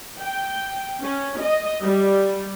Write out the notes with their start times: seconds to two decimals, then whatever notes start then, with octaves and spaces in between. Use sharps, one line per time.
0.22 G5
1.02 C#4
1.41 D#5
1.84 G3